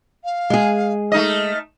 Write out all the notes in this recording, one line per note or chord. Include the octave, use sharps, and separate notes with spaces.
F5
G#3 G#4
A3 D#4 D#5 F6